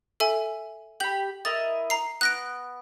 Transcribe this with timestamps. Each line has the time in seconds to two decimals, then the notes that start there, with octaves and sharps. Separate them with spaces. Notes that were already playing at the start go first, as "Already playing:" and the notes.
0.20 A4 E5 G#5
1.00 G4 B5 G6 F#7
1.45 E4 A#4 D#5 A6
1.90 A#5 C7
2.21 B3 F#6 A#6 D7